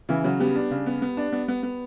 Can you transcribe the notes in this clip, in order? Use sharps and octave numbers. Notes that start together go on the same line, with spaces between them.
C#3 E3 E4
C#3 F#3 F#4
G3 B3 G4
D4
C#3
B3
B3
D4
B3
B3
B3